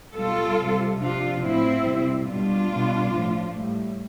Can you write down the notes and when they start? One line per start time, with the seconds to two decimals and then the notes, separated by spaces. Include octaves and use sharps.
0.15 B2 G3 F4 A4
0.57 C3 G3
0.99 C3 F3 D4 F4
1.42 A2 F3 C4 E4
1.83 C3 G3
2.26 B2 G3 D4 F4
2.68 B2 G3
3.10 A2 F3
3.52 A2 G3